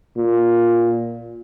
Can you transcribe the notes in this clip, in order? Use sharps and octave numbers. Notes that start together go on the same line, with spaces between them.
A#2